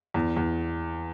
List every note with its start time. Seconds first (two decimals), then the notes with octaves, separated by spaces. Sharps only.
0.14 E2
0.36 E2